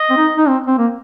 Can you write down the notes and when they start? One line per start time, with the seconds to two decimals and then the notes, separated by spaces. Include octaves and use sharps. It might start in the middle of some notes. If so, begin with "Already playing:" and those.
Already playing: D#5
0.10 C4
0.17 D#4
0.37 D#4
0.48 C4
0.66 C4
0.78 A#3